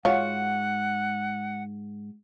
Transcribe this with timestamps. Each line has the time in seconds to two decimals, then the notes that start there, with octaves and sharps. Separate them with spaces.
0.05 G#2 F4 F#4 C#5 F#5